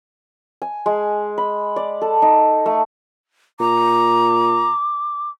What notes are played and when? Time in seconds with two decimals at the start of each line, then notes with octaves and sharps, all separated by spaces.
0.62 G#5
0.86 G#3
1.38 B5
1.76 D5
2.02 A4
2.22 D#4
2.66 A3
3.60 A#2 A#5 D6